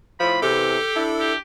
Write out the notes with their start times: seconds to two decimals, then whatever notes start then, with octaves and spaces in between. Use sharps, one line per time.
0.20 A2 F3 B5
0.42 E2 C3 G4 A4
0.96 D4 E4
1.20 G4